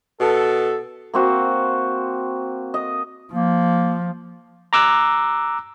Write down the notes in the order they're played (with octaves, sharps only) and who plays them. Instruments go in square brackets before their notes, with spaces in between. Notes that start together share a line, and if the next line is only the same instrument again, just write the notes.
[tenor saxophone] B2 [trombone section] A4
[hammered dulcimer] A#3 C4 F#4
D#5
[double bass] F3 [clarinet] A#3
[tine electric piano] A#5 D6 E6 F#6